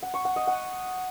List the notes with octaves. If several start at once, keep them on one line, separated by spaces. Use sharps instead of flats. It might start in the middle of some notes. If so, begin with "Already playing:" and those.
F#5
C#6
F#5
D#5
F#5